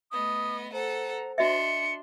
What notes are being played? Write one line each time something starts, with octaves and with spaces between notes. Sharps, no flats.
A3 B3 D#5 D#6
A4 C5 F#5 A#5
D4 F#4 D#5 E5 C6 C#7